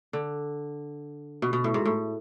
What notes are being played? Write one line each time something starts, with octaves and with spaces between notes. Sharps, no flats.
D3
B2
B2
A2
G#2
A2